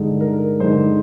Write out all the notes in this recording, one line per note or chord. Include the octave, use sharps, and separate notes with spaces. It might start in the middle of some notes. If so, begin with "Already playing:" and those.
Already playing: G2 D3 G#3 D#4
A#4
G2 D3 G#3 D#4 C5